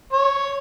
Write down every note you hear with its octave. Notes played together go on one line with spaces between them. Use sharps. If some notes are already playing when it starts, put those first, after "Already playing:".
C#5